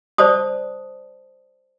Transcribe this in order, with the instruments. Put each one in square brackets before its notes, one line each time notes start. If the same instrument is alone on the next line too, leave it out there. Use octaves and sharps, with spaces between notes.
[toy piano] C5 D5 A5 D#6